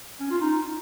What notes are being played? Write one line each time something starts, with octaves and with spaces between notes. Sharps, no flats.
C#4
F4
D#4